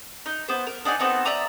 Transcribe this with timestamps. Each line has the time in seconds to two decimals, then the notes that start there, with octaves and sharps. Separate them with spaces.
0.26 D#4
0.48 B3 C5
0.67 A#4
0.85 D4 D#4 F#5 G#5
0.99 B3 C4 D#4 A4
1.25 D5 E5 A#5 D#6